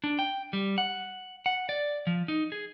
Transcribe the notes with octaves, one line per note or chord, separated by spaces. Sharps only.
D4
G5
G3
F#5
F#5
D5
F3
D#4
G#4